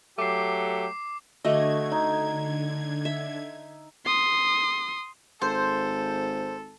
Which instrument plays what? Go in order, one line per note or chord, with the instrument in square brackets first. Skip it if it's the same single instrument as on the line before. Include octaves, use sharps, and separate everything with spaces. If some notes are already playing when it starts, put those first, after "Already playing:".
[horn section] F#3 A3 G4 [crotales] D6 C7
[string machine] D3 G#6 [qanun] A3 F#4 D#5 [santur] E5 D6
[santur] D#4
[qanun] E5
[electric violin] C6 D#6
[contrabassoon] G#1 [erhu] A4 [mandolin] C5